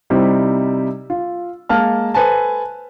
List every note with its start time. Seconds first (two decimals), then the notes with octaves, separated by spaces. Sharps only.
0.10 C3 G3 D#4 E4 G4 C5
1.10 F4
1.69 G#3 A#3 A5 F6
2.14 A4 B4 C5 G#5 A5